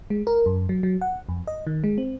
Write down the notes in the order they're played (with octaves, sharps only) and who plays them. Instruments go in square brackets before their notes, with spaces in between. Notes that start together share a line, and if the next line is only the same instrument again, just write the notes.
[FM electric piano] G#3
A#4
F#2
F#3
F#3
F#5
F2
D#5
D#3
G#3
C4